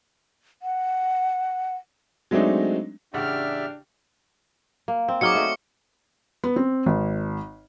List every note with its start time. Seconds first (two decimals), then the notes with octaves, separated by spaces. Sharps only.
0.62 F#5
2.31 F#3 G#3 A3 C4 D4 D#4
3.14 A1 C#3 D4 G4 D5 E5 F#5 F6
4.88 A#3
5.09 C4
5.21 F#3 D#4 G#4 D6 F6 C#7
5.35 A3 D5 D#5
6.44 B3
6.56 C4
6.86 G#1